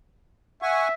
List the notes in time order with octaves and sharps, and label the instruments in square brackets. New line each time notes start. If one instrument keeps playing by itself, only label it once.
[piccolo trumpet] E5 [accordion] F#5 G#5 C#6